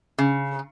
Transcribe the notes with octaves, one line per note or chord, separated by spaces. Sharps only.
C#3